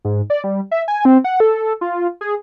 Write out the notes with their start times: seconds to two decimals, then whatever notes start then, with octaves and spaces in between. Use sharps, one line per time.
0.05 G#2
0.30 D5
0.44 G3
0.71 E5
0.88 G#5
1.05 C4
1.24 F#5
1.40 A4
1.81 F4
2.21 G#4